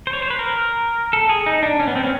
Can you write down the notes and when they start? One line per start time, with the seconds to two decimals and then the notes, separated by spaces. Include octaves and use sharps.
0.07 C5
0.13 C#5
0.22 C5
0.30 B4
0.39 A#4
1.13 A4
1.29 G#4
1.46 D#4
1.63 D4
1.80 C#4
1.88 B3
1.95 C4
2.04 C#4